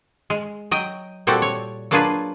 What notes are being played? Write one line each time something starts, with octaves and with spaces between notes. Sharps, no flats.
G#3
F#3 D#5 G5
A#2 G3 C4 F#4 G4 A4
C#5
F#3 A#3 D4 F4 G#4 B4